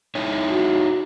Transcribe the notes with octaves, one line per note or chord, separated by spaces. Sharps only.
D#4 E4 C#5
F#4